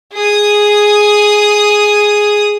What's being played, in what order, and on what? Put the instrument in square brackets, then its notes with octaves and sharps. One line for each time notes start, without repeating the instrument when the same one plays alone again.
[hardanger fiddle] G#4 D#6